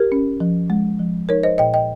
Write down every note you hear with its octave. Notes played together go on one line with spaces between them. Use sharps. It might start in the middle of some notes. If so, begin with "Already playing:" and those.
Already playing: G4 A#4
C#4
F3
G#3
F3
D#4 A#4 C#5
C5 D#5
A#2 D#5 G5
D#5 G5